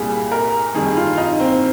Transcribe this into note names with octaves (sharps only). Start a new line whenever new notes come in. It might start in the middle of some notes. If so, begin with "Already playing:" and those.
Already playing: C2 A#2 G3 G#4
A#4
F2 D#3 G3 G#4
F4
D#4
C4